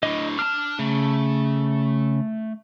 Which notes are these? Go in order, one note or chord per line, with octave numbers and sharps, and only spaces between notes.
A2 D3 D#5
D4 A5 F6
C#3 A3